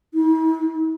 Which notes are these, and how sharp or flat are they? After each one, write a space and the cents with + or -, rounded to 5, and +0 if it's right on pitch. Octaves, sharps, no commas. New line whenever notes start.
E4 -45